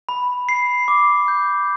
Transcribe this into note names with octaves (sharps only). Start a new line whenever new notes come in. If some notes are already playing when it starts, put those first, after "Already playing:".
B5
C7
D6
G6